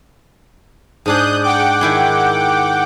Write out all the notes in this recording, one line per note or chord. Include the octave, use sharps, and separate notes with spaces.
G#2 D4 G#4 D#6 F#6 G6
F#5 G5 D6
D#3 E4 G#4